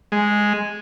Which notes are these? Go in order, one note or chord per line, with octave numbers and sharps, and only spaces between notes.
G#3